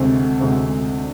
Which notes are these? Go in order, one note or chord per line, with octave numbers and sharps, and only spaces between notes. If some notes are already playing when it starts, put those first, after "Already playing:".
Already playing: D2 C3 G#3 C4
D2 C3 G#3 C4
D4